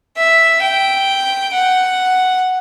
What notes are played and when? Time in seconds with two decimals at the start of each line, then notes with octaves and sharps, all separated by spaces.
0.17 E5
0.62 G5
1.54 F#5